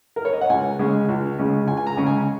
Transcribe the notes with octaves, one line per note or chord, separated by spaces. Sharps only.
A#4
C#5
D#5
F#5
C#2 G#5
C#3 G#3 C#4
C#2
C#3 G#3 C#4
C#2 G#5
G#5
A#5
C#3 G#3 C#4
G#5